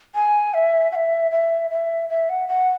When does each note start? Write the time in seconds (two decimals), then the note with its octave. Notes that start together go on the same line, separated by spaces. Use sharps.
0.15 G#5
0.54 E5
0.92 F#5
0.95 E5
1.31 E5
1.70 E5
2.09 E5
2.29 F#5
2.48 F#5